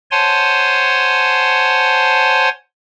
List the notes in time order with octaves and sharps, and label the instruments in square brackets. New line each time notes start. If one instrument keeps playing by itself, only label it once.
[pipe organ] C5 C#5 F#5 G#5 A5 C6